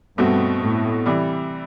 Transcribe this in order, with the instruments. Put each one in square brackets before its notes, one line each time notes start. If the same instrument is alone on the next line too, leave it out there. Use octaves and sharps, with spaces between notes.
[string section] G2 [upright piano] B2 A3 C4 F#4
[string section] A2
[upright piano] C3 E3 G3